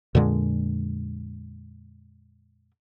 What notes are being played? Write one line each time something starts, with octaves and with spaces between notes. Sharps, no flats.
F2 A#2 D3 G#3